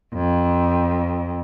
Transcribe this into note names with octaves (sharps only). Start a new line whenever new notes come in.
F2